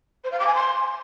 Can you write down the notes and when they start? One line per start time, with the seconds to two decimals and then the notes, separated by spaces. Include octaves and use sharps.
0.24 C5
0.32 F5
0.39 D6
0.47 G#5
0.55 C6